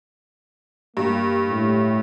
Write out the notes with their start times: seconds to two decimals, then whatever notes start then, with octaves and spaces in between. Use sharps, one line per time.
0.97 G2 A#3
1.48 A2